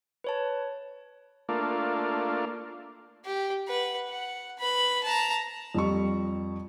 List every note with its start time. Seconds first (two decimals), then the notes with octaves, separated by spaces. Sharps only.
0.24 B4 C#5 A5
1.49 A3 A#3 D4 F4
3.25 G4
3.68 B4 F#5
4.08 F#5
4.59 B4 B5
5.04 A5 A#5
5.75 F2 G3 C#6